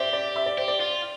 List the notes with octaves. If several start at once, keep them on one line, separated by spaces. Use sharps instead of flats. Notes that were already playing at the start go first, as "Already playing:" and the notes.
Already playing: G4 C5 D5 E5
D5
E5
D5
G4 C5
D5
F4